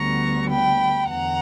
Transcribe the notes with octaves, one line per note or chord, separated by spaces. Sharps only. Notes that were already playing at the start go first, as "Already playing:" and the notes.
Already playing: D2 D3 G3 B3 A#5 C#6
G5 B5
E2 D3 F#5 A#5